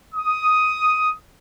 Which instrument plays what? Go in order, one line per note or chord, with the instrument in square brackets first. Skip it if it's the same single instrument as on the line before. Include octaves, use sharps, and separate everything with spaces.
[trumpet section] D#6